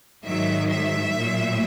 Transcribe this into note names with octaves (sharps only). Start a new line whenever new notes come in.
G#2 D#3 F#3 E5
E5
A#2 F#3